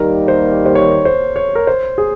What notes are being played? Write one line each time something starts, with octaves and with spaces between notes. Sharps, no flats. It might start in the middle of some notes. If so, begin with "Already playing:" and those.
Already playing: D#2 D#3 G3 A#3 A#4
C5
C5
C#5
C5
C#5
A#4
C5
G#4